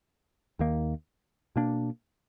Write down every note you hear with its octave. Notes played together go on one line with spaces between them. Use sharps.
D#2 D#3 A#3
B2 A#3 D4